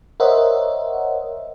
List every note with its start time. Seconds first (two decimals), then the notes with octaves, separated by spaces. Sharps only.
0.20 A#4 C5 C#5 D#5 E5 F#5